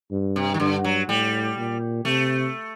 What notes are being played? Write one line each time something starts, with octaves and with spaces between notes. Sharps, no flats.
G2
C3
D#3
G2 D3
F#3
A2 G3
A#2
C3 A3